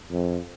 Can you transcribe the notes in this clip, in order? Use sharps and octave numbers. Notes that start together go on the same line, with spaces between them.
F2